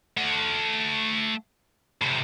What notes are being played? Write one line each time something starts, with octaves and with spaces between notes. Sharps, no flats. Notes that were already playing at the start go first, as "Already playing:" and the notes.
A3 F#5
A2 C3